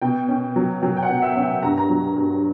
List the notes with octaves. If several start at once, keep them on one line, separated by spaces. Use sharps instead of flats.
B2 G5
C#4
F#3
F#3 G5
G5
F#5
B2
E5
C#4
G5
G2 A#5
A#5
F#3
G2